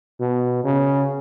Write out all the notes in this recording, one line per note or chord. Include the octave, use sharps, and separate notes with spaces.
B2
C#3